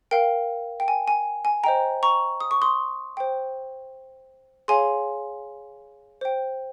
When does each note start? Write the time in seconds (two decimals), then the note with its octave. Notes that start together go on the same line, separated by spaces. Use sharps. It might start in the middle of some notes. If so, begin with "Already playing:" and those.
0.11 A#4 F5 G5
0.80 G5
0.88 G#5
1.08 G#5
1.45 G#5
1.64 C5 D#5 G5 A#5
2.03 A#5 C#6
2.40 D#6
2.51 C#6
2.62 C6 D#6
3.17 C5 G5
4.68 G#4 C#5 F5 G#5 C6
6.21 C5 G5